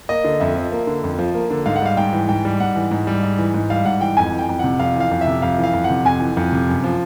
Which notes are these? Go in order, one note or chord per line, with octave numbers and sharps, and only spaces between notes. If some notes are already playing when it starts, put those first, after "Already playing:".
A#3 D#5
D3
F2 E5
F3
A#3
D3
F2
F3
A#3
D3
G#2 F5
F#5
G3 F5
G#2 G5
E3
G#2 G5
G3
G#2 F#5
E3
G#2
G3
G#2
E3
G#2
G3 F5
G#2 F#5
E3 G5
F2 G#5
E3
G5
F2
C3 F#5
F2 F5
E3
F5
F2
E5
C3
F2 F5
E3
F5
F2
F#5
C3
F2 G#5
E3
F2
C3
F#2
F3